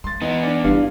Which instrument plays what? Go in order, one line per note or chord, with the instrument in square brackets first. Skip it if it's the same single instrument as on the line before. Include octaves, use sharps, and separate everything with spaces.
[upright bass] G#3 [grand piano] C6 A6
[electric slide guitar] E3 B3 [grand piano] D#4
[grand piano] D4
[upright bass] G1 [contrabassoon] G2 [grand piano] F5